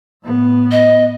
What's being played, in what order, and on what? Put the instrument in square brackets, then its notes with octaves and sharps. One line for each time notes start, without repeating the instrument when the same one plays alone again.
[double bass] A2 B3
[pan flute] D#5